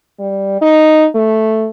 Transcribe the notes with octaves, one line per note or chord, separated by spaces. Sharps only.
G3
D#4
A3